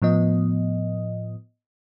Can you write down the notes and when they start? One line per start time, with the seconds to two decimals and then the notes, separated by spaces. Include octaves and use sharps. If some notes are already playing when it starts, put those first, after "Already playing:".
0.02 A2 F3 B3 D#5